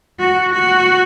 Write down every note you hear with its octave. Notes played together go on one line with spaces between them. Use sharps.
F#4
F#4